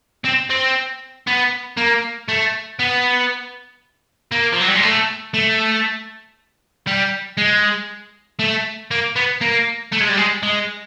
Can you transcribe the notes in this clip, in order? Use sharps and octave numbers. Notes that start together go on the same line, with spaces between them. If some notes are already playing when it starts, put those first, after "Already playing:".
C4
C4
B3
A#3
A3
B3
A#3
F3
F#3
G3
G#3
A3
A3
G3
G#3
A3
A#3
B3
A#3
A3
G#3
G3
G#3
G#3